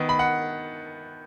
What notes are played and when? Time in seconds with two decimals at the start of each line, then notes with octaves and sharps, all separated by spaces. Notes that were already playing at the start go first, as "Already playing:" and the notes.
Already playing: D#3 B3
0.09 B5
0.19 F#5